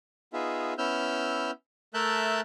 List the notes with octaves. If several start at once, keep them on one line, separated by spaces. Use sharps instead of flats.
B3 D#4 F4 G#4 E5
B3 C#4 E4 E6 F6 G6
A3 A#4 E5 A5 F#6 G6